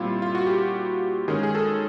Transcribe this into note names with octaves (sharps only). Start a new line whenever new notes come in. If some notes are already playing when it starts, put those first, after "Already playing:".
Already playing: A#2 G3 C4 E4 F4
F4
F#4
G4
D#3 G#3 C#4 G#4
G#4
A4